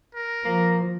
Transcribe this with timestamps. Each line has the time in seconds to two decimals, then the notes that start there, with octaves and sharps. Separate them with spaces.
0.15 A#4
0.44 F3 A#3